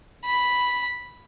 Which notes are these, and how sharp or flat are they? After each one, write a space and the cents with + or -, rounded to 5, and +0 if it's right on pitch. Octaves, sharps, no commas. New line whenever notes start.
B5 -5